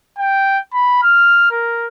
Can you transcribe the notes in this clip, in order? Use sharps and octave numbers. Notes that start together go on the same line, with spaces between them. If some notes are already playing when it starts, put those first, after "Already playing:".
G5
B5
F6
A#4